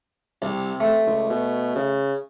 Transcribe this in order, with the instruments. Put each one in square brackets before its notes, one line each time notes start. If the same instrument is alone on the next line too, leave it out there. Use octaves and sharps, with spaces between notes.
[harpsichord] C2 [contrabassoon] C3
[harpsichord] A3
[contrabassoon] C#2
B2
C#3